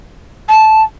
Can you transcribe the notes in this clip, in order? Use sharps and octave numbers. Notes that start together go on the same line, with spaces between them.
A5